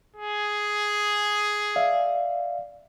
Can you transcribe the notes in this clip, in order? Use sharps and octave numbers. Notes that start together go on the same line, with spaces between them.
G#4
D5 E5 F5